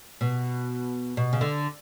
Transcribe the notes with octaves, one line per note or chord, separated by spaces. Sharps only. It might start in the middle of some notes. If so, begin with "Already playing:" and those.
B2
B2
C#3
D3